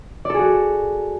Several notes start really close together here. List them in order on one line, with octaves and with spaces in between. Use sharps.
D5 A4 G#4 F#4